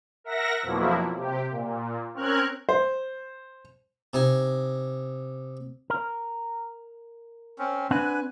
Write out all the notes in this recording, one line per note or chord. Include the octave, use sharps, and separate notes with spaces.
A#4 E5 F#5 A#6
F2 B2 F3 F#3 A#3 E4
C3 G4
A#2
C4 C#4 A#4 F6 F#6 G#6
C5
C3 D#4 G#5
A#4
C4 C#4
C4 D4 B4 F#5 G#5